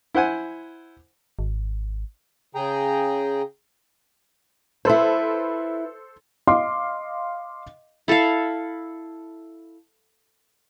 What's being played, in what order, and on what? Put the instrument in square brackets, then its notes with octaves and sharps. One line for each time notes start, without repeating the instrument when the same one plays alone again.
[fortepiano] E4 C5 F#5 G#5
[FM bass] G#1
[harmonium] C#3 G#4 G5 A#5
[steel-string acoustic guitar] E4 B4 [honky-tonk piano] A4 C5
[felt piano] D#5 F5 C6 D6
[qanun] E4 A4 E5 F5